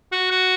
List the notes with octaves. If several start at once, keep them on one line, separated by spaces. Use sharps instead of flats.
F#4
F#4